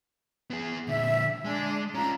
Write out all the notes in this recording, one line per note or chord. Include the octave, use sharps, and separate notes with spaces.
B3 G#4
A#2 D3 E5
G#3 D4 G#4
C#4 F4 A#5